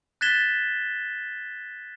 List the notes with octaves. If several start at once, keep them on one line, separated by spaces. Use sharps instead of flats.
F#6 G#6 A6 B6 E7 G7